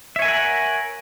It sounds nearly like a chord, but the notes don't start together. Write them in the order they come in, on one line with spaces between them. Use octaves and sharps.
E5 C#5 G#5 A#4 F#5